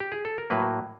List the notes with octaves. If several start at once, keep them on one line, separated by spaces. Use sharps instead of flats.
G4
G#4
A4
A#4
A2 F#3 A#3 B4